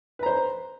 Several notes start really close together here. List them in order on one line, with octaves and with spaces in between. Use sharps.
B4 A#5 C5